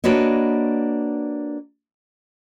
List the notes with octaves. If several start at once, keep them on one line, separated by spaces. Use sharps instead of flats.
A#3 D4 F#4 B4 C#5 D#5